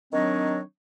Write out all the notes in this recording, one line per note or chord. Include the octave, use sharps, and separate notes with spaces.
D#3 F#3 C4 D4 C#5 D#5